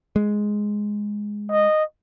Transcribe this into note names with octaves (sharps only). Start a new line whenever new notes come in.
G#3
D#5